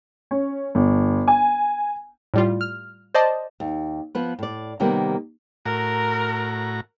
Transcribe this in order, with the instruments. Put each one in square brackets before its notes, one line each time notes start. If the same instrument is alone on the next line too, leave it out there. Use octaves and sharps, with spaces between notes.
[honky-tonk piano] C#4
G1
G#5
[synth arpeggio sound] A2 G3 F4
F6
C5 D5 D#5 A5
[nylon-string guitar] D#2
F3 B3 B4
A2 D5
C3 D#3 G3 A#3 B3
[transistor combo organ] A2 F#4 A#5 [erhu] A#4